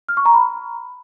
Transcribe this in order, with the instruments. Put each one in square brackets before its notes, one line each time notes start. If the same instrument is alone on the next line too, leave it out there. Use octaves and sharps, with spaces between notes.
[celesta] F6
C#6
A#5
B5